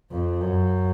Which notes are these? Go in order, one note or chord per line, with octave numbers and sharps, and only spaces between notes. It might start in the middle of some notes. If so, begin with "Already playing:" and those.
F2
F#2